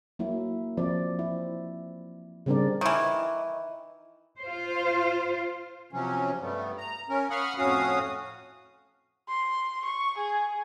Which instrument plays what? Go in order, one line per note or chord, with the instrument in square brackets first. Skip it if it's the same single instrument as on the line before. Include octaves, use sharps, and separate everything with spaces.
[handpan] F#3 A#3 E4
F3 C4 D5
E4
C#3 G3 C4 D4 A#4 D5
[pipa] D#3 E3
[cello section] F4 C5
[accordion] C3 F3 F#3 C#4
G2 G3 A3 B3
A#5
C#4 A#4
F5 F#5 B5 C#6 D#6 F6
F2 A2 C#4 F#4 F5 D#6
[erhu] C6
C#6
G#4